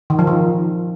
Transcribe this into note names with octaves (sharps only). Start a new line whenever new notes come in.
D#3
F3
D#3